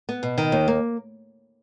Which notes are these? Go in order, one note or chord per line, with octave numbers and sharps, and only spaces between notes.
B3
B2
D#3
D#2
A#3